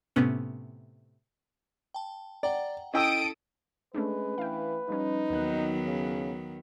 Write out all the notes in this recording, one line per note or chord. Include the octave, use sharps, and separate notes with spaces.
A2 C3 B3 C#4
G5 A5
D5 F#5 G5 A#5
C#4 E4 A4 D#5 G5 D#6 E6 D7
G#3 A3 C#4 D4 B4
E3 F5 G5
F3 G3 C#4 D#4
D#2 D#3 F#3 B3 F#6
C#3